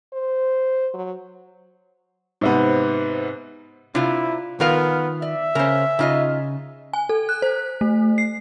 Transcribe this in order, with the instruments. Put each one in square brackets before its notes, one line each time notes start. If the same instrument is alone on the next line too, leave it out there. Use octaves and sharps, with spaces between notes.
[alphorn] C5
F#3
[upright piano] G#2 C3 B3
[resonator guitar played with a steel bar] C3 [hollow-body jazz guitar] D4 F4 [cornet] E4
[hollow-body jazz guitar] D#3 F4 [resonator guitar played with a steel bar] F3 A#4 F5 [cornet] B3
[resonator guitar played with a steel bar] D5 [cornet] E5
[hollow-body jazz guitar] C#3 C#4 [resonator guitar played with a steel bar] A#4 C5
[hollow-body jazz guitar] C#3 [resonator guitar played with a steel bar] D#4 F4 D#5
[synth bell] G#5
A4
F#6
C5
A3
C7